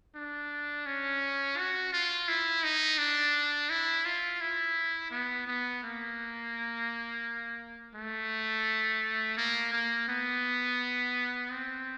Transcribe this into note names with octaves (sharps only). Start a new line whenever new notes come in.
D4
C#4
F#4
F4
E4
D#4
D4
E4
F4
E4
B3
B3
A#3
A3
A#3
A#3
B3
C4